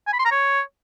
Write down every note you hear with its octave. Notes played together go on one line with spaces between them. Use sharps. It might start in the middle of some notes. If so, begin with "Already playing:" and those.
G#5
B5
C6
A#5
C#5